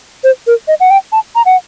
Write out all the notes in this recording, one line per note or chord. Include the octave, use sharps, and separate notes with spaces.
C5
A#4
D#5
F#5
G5
A5
A#5
F#5